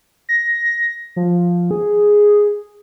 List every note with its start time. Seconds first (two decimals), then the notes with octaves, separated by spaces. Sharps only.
0.29 A#6
1.16 F3
1.71 G#4